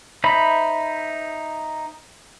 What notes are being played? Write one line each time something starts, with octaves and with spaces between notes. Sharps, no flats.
D#4 C5 E5 B5